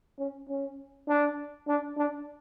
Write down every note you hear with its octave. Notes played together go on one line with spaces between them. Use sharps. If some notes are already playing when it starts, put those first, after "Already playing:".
C#4
C#4
D4
D4
D4